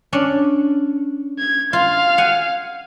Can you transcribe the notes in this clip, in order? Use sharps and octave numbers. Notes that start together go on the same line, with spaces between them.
C#4 D4
G#6
F4 F5
F#5 G#5